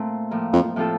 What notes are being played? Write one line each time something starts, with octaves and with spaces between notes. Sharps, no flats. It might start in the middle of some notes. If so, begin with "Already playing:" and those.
Already playing: A#2 A3 C4
A2 F3 A#3
F2
A2 F3 C4 F4 A4